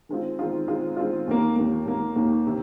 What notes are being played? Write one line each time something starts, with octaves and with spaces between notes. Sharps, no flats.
D#3 G#3 C4 F4
D#3 G#3 C4 F4
D#3 G#3 C4 F4
D#3 G#3 C4 F4
D#2 D#3 A#3
D#2 D#3 A#3
D#2 D#3 A#3
D#2 D#3 A#3
C3 D#3